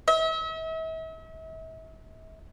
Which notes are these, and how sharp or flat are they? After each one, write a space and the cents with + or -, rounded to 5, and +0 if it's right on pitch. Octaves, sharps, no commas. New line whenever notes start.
E5 -40